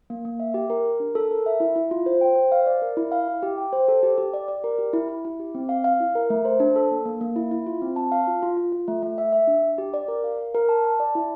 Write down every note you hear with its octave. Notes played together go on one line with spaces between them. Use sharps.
A#3
A#3
E5
G4
A#4
A#4
D4
A4
A#4
E5
E4
E4
F4
C5
G5
C5
F5
D5
A#4
E4
F5
E4
G4
G5
C5
A4
G4
G4
D5
D5
A#4
G4
E4
E4
E4
G4
C4
F5
F5
E4
A#4
A3
C5
D4
A4
A#3
A#3
A#3
E4
E4
F4
C4
A5
F5
F4
F4
F4
F4
A3
A3
E5
E5
D4
D4
G4
D5
A#4
F5
A#4
A#4
A5
A5
D5
E4